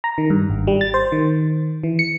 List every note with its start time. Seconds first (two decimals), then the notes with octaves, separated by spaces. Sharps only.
0.04 A#5
0.18 D#3
0.30 G2
0.50 G#1
0.67 G3
0.81 A6
0.94 C5
1.12 D#3
1.83 E3
1.99 C#7